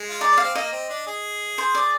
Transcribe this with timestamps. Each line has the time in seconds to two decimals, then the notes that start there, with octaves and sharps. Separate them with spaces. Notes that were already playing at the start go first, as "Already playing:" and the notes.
Already playing: G#3
0.09 F4
0.21 D#4 D5
0.31 D4
0.38 F5
0.43 C4
0.55 A#3 D#5
0.72 C4
0.89 D4
1.07 G#4
1.58 C5
1.75 D5